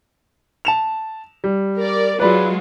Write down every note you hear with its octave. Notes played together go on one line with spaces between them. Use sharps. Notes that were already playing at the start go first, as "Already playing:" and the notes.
A5 E7 F7
G3
A#4 D5
F#3 G#3 F4 B4 D5 B5